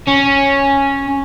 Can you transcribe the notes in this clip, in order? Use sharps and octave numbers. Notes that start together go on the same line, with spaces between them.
C#4